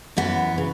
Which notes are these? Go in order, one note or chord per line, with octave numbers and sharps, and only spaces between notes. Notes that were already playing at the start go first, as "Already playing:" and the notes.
F#2 E3 B3
C#3